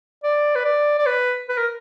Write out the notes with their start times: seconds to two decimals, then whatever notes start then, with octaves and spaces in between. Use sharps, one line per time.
0.23 D5
0.55 B4
0.65 D5
0.98 D5
1.06 B4
1.49 B4
1.57 A#4